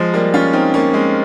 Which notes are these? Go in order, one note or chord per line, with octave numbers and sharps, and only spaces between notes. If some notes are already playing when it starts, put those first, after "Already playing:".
Already playing: F3 G#3
G3 A#3
C#4 F4
C4 D#4
A#3 C#4
G#3 C4